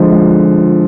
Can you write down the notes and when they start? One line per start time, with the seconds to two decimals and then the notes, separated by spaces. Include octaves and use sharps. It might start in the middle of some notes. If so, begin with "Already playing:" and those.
Already playing: D3 F3 G#3
0.12 G#3